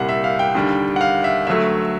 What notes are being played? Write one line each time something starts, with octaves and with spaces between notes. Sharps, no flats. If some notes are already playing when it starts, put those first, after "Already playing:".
Already playing: C2 A#2 G3 F#5
E5
F5
G5
D#2 D3 G3
F#5
F5
E5
D2 D3 F#3 A3 E5